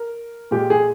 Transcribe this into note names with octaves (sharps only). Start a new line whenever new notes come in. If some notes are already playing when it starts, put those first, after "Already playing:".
Already playing: A#4
A#2 G#3 G4
G#4